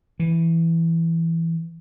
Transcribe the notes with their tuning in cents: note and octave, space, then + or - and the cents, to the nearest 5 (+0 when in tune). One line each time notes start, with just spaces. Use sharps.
E3 +5